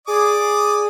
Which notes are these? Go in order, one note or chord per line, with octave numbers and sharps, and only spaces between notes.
G#4 D5 D6 D#6